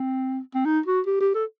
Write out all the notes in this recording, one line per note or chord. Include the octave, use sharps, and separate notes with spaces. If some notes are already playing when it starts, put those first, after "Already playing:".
Already playing: C4
C4
D#4
F#4
G4
G4
A4